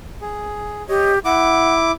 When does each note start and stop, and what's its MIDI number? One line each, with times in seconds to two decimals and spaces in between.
0.21 0.83 68
0.89 1.19 67
0.89 1.12 73
0.89 1.12 75
1.25 1.92 64
1.25 1.74 78
1.25 1.92 86